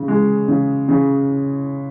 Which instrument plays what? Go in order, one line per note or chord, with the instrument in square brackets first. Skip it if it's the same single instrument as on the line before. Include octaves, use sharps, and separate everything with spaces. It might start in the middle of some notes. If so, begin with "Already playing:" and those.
Already playing: [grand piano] C#3
G#3
C#3
C#3